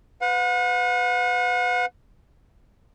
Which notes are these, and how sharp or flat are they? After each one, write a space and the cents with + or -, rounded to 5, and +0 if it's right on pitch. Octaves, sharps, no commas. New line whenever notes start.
B4 +25 F#5 -40